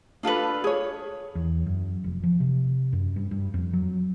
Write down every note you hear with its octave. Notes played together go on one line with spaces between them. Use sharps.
D4 F4 A4 B4
G#4 C#5
E2
F#2
F1
F3
C3
F#2
G2
G2
F2
F#3